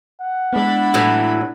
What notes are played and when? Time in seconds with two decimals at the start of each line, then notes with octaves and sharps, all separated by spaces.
0.21 F#5
0.53 G#3 B3 D4 E4 B5
0.94 A2 E3 F#3